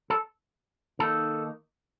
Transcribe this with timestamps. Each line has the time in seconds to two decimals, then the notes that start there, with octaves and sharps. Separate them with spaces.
0.10 A4
0.99 D#3 A#3 D#4 A4